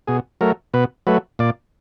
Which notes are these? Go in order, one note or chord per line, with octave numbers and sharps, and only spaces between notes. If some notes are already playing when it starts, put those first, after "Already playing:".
B2 G#4
F#3 A3 A#4
B2 B4
F#3 A3 B4
A#2 D5